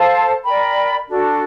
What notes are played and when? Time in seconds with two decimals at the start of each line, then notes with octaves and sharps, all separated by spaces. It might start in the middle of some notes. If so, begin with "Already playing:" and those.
Already playing: A4 C5 F5 A5
0.45 A#4 D5 G5 B5
1.08 D4 F#4 A4